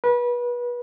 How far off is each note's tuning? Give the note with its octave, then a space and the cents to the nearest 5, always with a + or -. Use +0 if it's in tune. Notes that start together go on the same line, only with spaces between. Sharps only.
B4 -30